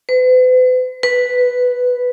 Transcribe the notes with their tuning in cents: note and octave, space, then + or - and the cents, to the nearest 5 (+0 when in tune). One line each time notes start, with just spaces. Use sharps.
B4 +45
B4 +0